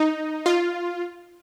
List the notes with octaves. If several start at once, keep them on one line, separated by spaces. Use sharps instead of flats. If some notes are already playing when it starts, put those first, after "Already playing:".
Already playing: D#4
F4